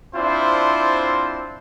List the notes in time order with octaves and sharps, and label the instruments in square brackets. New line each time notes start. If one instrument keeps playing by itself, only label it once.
[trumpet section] C4 D4 E4 F4 C5